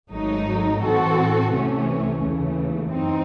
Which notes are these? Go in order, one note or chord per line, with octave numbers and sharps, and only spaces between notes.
G#1 G#2 F#3 A3 D#4
A2 E3 C4 F#4 A4
C2 C3 E3 A3 C#4
D#2 C#3 E3 A3
F#2 E3 C4 D#4